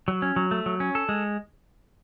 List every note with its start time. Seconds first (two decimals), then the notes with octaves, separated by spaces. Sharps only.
0.08 F#3
0.22 C#4
0.36 F#3
0.51 A3
0.66 F#3
0.80 C#4
0.95 A4
1.09 G#3